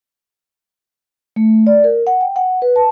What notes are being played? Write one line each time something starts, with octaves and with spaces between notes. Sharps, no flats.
A3
D5
A#4
F#5
G5
F#5
B4
A5